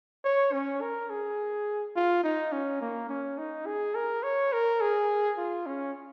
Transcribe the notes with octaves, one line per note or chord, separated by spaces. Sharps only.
C#5
C#4
A#4
G#4
F4
D#4
C#4
A#3
C#4
D#4
G#4
A#4
C#5
A#4
G#4
F4
C#4